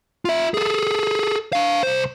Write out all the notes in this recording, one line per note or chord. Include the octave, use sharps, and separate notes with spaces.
F4 E5
G#4 A4
D4 F5
C2 C5